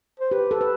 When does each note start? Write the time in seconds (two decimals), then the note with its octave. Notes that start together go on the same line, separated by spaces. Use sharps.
0.20 C5
0.31 G4 B4
0.51 A4
0.61 B4